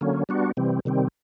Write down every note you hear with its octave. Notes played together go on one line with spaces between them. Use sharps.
D3 F#3 A#3 C#4
G3 B3 D4 F#4
C3 E3 G3 C4
C3 D#3 G3 C4